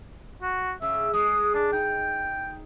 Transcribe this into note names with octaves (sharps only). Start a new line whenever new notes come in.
F#4
C#3 E5
G#3 D#6
D4
D#4 G5